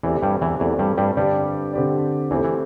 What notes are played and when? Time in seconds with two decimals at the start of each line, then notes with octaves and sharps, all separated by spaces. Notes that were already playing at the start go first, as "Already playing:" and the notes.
0.03 E2 E3 A3 C4 G4 D5
0.23 G2 G3
0.42 E2 E3
0.60 E2 E3 A3 C4 G4 D5
0.79 G2 G3
0.97 G2 G3
1.17 G2 D3 G3 C4 G4 D5
1.73 D3 C4 G4 D5
2.31 E2 E3 A3 C4 G4
2.44 E3